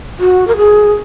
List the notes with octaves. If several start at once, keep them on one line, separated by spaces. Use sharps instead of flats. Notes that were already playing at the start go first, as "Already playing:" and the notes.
F#4
A#4
G#4